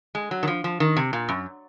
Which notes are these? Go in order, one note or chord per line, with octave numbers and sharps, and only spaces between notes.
G#3
F#3
D#3
F3
F3
D#3
C3
A#2
F#2